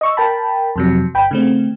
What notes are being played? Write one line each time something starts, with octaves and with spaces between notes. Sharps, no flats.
D#5 C#6 E6
A#4 G5 A5 B5
F2 C3 F#3
G1 G5 B5
C#3 A3 C4